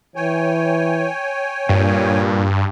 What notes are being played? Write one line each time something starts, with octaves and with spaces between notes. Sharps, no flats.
E3 C#5 G5 G#5
G2 A#2